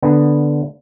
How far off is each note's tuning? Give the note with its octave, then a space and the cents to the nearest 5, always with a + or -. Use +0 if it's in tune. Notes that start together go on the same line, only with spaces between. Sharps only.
D3 +0 B3 +0 A#5 +0